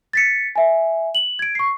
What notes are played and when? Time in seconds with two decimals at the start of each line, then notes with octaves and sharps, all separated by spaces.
0.13 A6 B6 C#7
0.56 E5 G#5
1.15 F#7
1.39 G#6 D7
1.55 C#6 C7